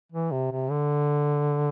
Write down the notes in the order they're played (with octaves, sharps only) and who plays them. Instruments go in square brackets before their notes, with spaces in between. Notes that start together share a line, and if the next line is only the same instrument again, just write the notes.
[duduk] E3
C3
C3
D3